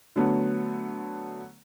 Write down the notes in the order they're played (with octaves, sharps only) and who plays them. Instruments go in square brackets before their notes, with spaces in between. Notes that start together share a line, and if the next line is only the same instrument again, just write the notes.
[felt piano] D3 F#3 A3 B3